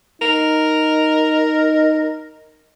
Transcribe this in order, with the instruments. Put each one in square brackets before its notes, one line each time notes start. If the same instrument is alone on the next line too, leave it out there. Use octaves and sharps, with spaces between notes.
[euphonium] D#4 [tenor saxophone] A#4